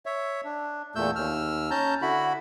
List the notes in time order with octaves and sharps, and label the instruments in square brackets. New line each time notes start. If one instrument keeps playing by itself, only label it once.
[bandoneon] C#5 E5
D4
E2 A#2 A3 E6 G6
D#2 E6 F6
C#4 A5 A#5 G6
D3 E4 F#4 B5